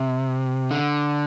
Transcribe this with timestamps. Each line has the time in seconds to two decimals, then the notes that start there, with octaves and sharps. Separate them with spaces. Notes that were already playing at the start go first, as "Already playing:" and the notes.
Already playing: C3
0.71 D3